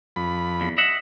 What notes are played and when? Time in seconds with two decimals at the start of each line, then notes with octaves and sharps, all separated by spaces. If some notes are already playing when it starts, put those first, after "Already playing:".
0.16 F2 B5
0.61 E2
0.78 D#5 E5 F#5